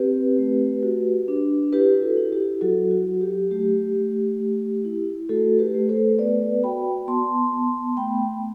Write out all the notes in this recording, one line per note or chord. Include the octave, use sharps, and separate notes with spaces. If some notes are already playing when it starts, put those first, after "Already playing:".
Already playing: C4 G4 B4
A3
F#4
D4
E4 G4 B4
F#4 A4
E4
G4
F#3 F#4 A4
F#4
F#3
G4
A3 G4
A3
A3
E4
A3 F#4 A4
G4 B4
A3
A4 C5
B3 B4 D5
F#4 G5 B5
B3 A5 C6
B3
A3 G5 B5